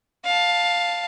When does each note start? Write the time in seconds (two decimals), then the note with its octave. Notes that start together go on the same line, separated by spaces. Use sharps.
0.25 F5 A5